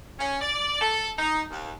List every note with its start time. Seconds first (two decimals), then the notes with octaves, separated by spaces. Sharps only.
0.19 C#4
0.41 D5
0.81 A4
1.18 D#4
1.51 D#2